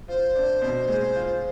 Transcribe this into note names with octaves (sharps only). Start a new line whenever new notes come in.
F4 C5
D4
B2
G#3
F4